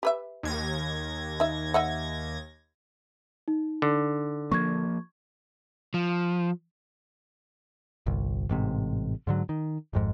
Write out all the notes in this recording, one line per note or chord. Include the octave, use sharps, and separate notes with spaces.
G4 B4 E5
D#2 G#6 A#6
D#4 E5
D#5 E5 F#5
D#4
D3
F3 A#3 C#6 G#6
F3
G1 C2
A1 G#2 C3
G#2 D3 F#3
D#3
G#1 F2 G#2